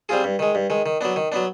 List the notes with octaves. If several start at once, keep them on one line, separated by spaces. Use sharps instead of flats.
G3 C4 F4 G#4
G2
D#3 G#3
G2
D#3 G#3
D#3
F#3 B3 D4
D#3
F#3 B3 D4